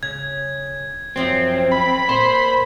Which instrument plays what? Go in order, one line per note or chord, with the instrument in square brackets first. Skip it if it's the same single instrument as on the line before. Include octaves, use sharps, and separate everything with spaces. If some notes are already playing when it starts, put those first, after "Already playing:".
[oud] C#3 [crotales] G#6
[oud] F#2 F3 F#3 [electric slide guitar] C4
[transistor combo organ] B5
[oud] A#2 [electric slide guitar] C5